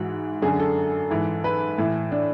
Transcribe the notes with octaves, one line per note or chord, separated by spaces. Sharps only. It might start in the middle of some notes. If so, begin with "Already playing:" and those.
Already playing: G#2 E3 F#4
F#2 D3 G#4
A4
G#2 E3
B4
A2 E3
D4